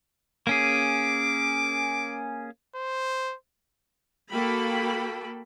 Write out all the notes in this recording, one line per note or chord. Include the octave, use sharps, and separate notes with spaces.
A#3 C#4 G#4 D6
C5
A#3 F#4 A4 G5 B5